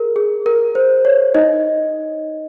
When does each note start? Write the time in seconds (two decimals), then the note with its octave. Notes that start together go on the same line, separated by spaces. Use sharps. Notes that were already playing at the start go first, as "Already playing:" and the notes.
Already playing: G#4 A#4
0.16 G#4
0.46 A#4
0.75 C5
1.05 C#5
1.34 D#4 D#5